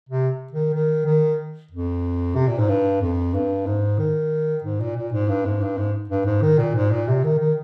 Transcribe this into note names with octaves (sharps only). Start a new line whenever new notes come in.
C3
D#3
D#3
D#3
F2
C3
A#2
G#2
G2
F2
G2
G#2
D#3
G#2
A#2
A#2
G#2
G2
G#2
G2
G#2
G2
G#2
D#3
A#2
G#2
A#2
C3
D#3
D#3